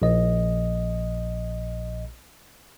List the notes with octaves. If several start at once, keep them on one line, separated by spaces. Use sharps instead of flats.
A#1 D#5